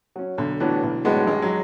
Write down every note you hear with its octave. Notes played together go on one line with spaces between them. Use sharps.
F#3 C#4
B1 D3
A2 E3 F#3 B3 D4
B1
A2 F#3 G#3 B3 D4
A1 G#3
F#3